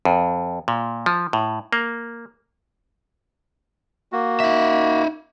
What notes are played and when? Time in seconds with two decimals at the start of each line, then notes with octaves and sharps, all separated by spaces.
0.05 F2
0.68 A#2
1.06 F3
1.33 A2
1.73 A#3
4.12 A#3 F#4
4.40 D#4 E5